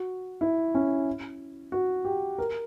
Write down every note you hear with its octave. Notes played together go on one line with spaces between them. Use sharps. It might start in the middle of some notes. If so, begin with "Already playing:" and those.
Already playing: F#4
E4
C#4
F#4
G4
A#4